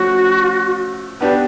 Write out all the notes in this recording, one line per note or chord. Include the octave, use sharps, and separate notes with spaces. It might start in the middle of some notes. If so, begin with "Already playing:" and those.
Already playing: F3 A3 C#4 F#4
B3 D4 G4 B4